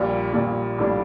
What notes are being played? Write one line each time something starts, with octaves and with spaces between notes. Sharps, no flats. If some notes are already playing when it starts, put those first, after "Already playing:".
Already playing: A#1 A#2 G3
A#1 A#2 G3
A#1 A2 G3 D4